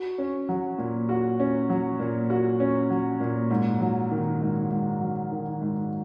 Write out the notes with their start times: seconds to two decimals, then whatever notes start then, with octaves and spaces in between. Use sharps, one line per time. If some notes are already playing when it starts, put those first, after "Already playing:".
Already playing: F#4
0.18 C#4
0.49 F#3
0.78 A#2
1.09 F#4
1.40 C#4
1.69 F#3
1.99 A#2
2.30 F#4
2.60 C#4
2.90 F#3
3.20 A#2
3.50 G#2
3.80 F#3
4.11 D#3
4.41 G#2
4.70 G#2
5.01 F#3
5.31 D#3
5.61 G#2